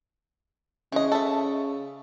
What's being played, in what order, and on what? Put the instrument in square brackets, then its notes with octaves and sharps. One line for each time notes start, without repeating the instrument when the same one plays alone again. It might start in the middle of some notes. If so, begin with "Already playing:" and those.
[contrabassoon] C#3 [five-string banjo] E3 D#5
[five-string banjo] A4 E5